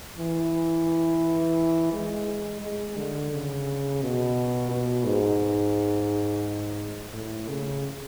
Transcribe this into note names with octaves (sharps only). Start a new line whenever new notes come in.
E3
G#3
G#3
D3
C#3
B2
B2
G#2
A2
C#3